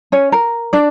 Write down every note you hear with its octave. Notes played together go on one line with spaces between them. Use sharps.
C#4 C#5
A#4
D4 D5